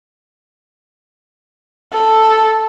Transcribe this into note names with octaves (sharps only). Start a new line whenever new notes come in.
A4